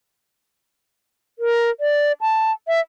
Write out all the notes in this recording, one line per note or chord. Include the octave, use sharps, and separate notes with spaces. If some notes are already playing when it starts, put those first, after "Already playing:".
A#4
D5
A5
E5